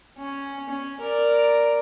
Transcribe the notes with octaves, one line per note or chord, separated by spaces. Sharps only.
C#4
C#4
A#4 D5